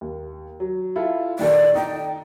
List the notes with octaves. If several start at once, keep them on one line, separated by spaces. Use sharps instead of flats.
D#2
F#3
E4 F4 A4
A#2 D#3 A4 D5
D#4 G5